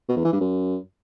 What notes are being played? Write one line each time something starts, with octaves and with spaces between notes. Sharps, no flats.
B2
E2
E3
G2
F#2